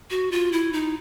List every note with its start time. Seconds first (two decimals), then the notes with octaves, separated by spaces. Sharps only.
0.10 F#4
0.31 F4
0.52 E4
0.73 D#4